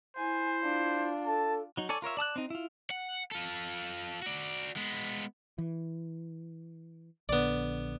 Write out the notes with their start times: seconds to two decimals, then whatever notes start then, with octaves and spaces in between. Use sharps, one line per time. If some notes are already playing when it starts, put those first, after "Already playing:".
0.17 E4 C5 G#5
0.63 D4 F4
1.26 A4 A5
1.77 F#3 D#4
1.89 A4 C#5 D5 G#5
2.02 F4 A#4 C#5 E5
2.17 D5 A5 D#6 F#6
2.36 C4 D#4
2.50 E4 F4
2.91 F#5
3.31 F4 A4
4.22 F#4 D5
4.76 G#3 B3
5.58 E3
7.29 A#1 D3 B3 D5